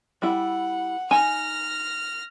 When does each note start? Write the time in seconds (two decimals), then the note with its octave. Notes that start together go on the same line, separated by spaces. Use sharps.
0.22 G3 E4 F#5
1.11 D#4 G#5 F6 A#6